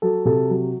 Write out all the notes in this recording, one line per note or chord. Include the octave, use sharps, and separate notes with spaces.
F#3 A4
C3 A4
F#3